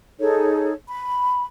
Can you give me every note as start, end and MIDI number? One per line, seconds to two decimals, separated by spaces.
0.20 0.73 63
0.20 0.73 68
0.20 0.73 69
0.20 0.73 73
0.87 1.46 83